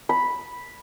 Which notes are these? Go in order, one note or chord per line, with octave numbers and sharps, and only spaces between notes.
B5